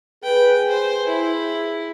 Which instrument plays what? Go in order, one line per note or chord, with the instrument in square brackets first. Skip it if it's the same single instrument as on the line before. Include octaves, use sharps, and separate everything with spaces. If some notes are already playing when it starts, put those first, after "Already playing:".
[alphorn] G#4 [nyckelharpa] B4 G5
[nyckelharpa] C5
E4